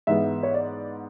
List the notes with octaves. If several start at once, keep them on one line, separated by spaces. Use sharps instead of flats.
G#2 E3 G#3 B3 E5
C#5
D5